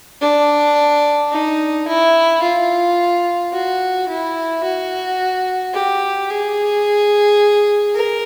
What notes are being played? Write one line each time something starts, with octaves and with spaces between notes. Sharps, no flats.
D4
D#4
E4
F4
F#4
E4
F#4
G4
G#4
A#4